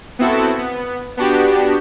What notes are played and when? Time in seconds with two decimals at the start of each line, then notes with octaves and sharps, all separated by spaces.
0.19 B3 C4 E4 F#4 A4
0.58 B3
1.17 B3 D4 F#4 G4